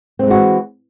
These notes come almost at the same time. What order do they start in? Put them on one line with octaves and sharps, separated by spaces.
C4 A3 G#3 F#4 E3